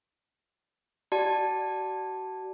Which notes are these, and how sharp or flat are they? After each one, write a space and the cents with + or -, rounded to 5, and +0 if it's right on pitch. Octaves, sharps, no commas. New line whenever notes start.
F#4 +35 D5 +0 A5 +0